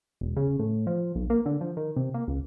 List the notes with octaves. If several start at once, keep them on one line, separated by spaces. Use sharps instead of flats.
E1
C#3
A2
F3
B1
A#3
D3
F3
D#3
C3
A#3
C#2